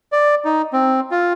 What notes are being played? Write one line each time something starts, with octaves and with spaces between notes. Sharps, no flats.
D5
D#4
C4
F4